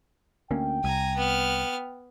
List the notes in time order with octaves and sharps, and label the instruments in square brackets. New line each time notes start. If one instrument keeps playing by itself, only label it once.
[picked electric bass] D2 A#3 C#4 [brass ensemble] G5
[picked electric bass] C2 [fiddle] G#5 A#5
[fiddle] B3 F6